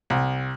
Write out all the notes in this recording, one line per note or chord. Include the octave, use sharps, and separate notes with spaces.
C2